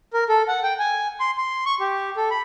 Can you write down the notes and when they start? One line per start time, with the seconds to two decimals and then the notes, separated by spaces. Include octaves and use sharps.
0.13 A#4
0.29 A4
0.48 F#5
0.63 G5
0.80 G#5
1.20 C6
1.37 C6
1.66 C#6
1.80 G4
2.17 A4
2.31 B5